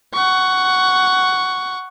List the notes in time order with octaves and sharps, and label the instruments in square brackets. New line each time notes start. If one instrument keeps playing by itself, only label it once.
[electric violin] F#5 C#6